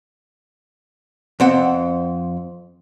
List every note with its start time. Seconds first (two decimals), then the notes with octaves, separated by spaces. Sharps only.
1.40 F2 C4 F#5